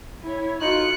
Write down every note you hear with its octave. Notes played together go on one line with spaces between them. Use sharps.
E4 C#5
D#4 F4 F#4 A4 C#6 F#6 C#7